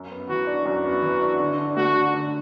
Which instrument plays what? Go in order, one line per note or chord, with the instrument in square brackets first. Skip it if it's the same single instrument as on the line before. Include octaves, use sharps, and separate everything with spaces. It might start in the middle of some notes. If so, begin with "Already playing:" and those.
Already playing: [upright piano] F#2
B3
[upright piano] E3 [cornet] F#4
[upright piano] D4
[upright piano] F#2 [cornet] F#4
[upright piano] B3
E3
D4
D3
D4
[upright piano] A3 [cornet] F#4
[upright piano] D3
D3